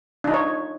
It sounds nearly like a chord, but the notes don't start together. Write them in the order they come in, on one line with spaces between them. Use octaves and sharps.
D4 D#4 F4 C#5